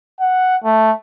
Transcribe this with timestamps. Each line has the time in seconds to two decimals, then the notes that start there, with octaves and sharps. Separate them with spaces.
0.20 F#5
0.64 A3